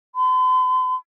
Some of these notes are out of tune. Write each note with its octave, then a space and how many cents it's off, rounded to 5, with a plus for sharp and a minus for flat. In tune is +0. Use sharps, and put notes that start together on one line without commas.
C6 -45